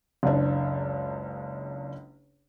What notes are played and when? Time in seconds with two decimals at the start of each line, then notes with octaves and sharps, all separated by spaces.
0.23 F#1 C#2 D4